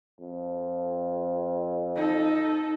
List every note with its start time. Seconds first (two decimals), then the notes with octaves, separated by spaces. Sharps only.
0.20 F2
1.96 D#4 A4